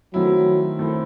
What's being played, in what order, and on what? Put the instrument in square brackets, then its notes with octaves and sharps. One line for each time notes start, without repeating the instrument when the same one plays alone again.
[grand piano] D#3 A3 C4 E4 [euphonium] F#3
[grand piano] D#3 A3 C4 E4